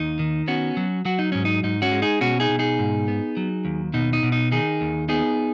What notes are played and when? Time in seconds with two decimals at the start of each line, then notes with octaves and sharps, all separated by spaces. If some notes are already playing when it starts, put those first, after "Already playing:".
Already playing: D#2 D#4
0.19 D#3
0.48 B3 C#4 F#4
0.77 F#3
1.05 F#3 F#4
1.19 D#4
1.32 G#2 C#4
1.45 D#4
1.63 G#2 D#4
1.82 C#4 F#4
1.92 G#3
2.02 D#4 G#4
2.21 B2 C#4 F#4
2.40 D#4 G#4
2.49 B2
2.59 D#4 G#4
2.79 G#2
3.08 B3
3.37 F#3
3.65 D#2
3.94 B2 D#4
4.13 D#4
4.23 B2
4.32 D#4
4.52 D#3 D#4 G#4
4.81 D#2
5.09 B3 D#4 G#4